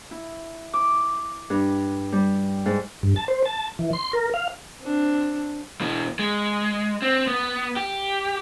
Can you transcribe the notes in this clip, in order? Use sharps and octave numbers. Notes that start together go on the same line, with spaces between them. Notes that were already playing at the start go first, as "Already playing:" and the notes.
E4
D6
G2
G3
G#2
G2
A5
C5
A5
E3
C6
A#4
F5
C4 D4
B2 E3
G#3
C4
B3
G4